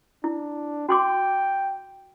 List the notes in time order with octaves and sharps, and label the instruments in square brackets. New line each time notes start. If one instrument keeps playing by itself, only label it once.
[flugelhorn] D4 [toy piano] E4
[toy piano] F#4 C6 D6 [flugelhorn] G5